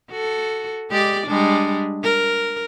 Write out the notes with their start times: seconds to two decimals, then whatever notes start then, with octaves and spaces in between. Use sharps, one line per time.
0.11 F#4 A4
0.90 G#3 G4 D5
1.27 G3 G#3 D4
2.03 A#4